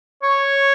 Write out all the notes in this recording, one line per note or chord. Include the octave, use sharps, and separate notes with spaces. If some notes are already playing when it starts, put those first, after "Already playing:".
C#5